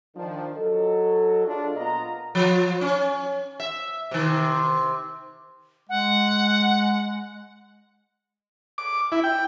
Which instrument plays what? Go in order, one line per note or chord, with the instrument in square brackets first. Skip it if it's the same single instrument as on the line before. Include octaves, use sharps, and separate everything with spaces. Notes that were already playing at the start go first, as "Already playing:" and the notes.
[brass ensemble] D#3 F3 D4
F#3 A4 D#5
D4 F4 G#4
A#2 B3 F4 D#5 A#5
[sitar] F3
C#4
E5
C3 D#3
[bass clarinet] G#3 [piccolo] F#5
[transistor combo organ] D6
E4
G5